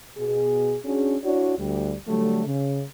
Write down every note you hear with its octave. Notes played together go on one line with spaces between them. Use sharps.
B2 G#4
C#4 D4 F#4 G#4
D4 E4 F#4 C#5 D5
D2 G3
D3 F#3 G3 A3
C#3